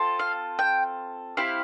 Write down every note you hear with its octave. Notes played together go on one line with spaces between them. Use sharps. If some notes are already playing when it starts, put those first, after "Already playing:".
Already playing: C4 F4 A4
F5
G5
C4 E4 G4 F5